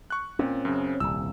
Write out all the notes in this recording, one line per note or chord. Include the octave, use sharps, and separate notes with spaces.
C#6 F#6
A#2 C4 C#4
F#2 C#3
D#1 C2 E6